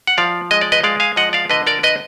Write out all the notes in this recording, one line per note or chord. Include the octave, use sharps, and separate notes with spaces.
F#5
F3 D5 F5
G#3 D#5
D5
B4 D#5
G#3 D5 F5
F5 G#5
F3 D#5 F#5
D5 F5
D3 B4 D#5
A#4 D5
B4 D#5